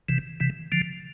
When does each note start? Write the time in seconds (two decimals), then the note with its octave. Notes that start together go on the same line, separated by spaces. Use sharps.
0.09 C3 E3
0.40 C3 E3
0.72 D3 F3